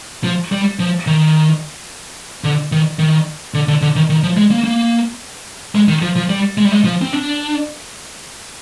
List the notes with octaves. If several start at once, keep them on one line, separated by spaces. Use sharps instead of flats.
F3
G3
F3
D#3
D3
D#3
D#3
D3
D3
D3
D#3
D#3
F3
G#3
A#3
A#3
G#3
D#3
F3
F3
G3
G#3
G3
G#3
F3
C4
D4